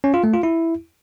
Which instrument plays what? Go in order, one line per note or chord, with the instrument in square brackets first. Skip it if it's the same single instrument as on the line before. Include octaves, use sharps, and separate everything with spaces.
[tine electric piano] C#4
F4
A3
F4
E4